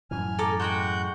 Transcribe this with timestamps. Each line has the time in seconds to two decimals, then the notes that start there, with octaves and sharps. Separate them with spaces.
0.11 F#2 A2 E3 G#5 F6
0.39 A4 A#5 D6
0.60 G#3 F#4 F#5 G5 C#6 G6